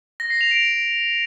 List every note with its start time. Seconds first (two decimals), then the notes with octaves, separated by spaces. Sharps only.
0.20 A#6
0.30 C7
0.41 F7
0.51 D7